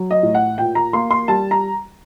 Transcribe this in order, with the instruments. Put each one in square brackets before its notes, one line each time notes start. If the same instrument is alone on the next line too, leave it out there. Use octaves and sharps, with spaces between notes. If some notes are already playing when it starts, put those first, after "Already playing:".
Already playing: [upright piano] F#3
D#5
A2
F#5
A#2 G5
A#5
A#3 C6
C6
G3 A5
A#5